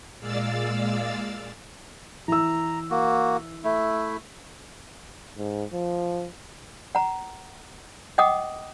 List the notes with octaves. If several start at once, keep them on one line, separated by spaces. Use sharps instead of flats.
A#2 G#3 D5 F5 E6 A6
E3 A#5 E6
A#3 F#4
A3 E4
G#2
F3
F#5 A#5
D#5 F#5 G5 D6 D#6